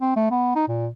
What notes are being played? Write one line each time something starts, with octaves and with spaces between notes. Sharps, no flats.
C4
A3
B3
D#4
A#2